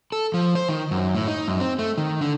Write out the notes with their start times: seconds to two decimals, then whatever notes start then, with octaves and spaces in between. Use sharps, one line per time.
0.12 A4
0.34 F3
0.55 C5
0.69 D#3
0.91 F#2
1.15 A2
1.28 D#4
1.48 F#2
1.60 C4
1.79 A3
1.98 D#3
2.21 D3